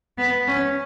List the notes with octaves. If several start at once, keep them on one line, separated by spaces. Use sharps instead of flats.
B3
C#4